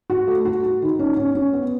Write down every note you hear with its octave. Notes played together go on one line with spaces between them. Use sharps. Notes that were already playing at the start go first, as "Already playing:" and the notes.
F#4
A3
F#4
F#4
D#3
C#4
C#4
C#4
B3